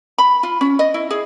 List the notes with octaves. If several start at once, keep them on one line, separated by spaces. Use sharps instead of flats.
B5
F4
C#4
D#5
E4
G#4